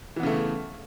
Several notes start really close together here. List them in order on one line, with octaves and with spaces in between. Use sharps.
E3 B3 C#3 A3